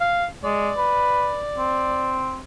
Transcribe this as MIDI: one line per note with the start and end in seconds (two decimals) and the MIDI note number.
0.01 0.27 77
0.44 0.70 56
0.44 2.21 74
0.77 1.38 71
1.57 2.42 60